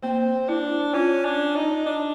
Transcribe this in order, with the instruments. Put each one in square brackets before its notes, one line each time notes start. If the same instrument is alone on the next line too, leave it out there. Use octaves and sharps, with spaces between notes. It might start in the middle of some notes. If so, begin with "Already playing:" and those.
[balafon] A#3 [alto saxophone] C4
[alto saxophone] D4 [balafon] E4
[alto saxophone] C#4 [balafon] F4
[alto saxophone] D4
D#4
D4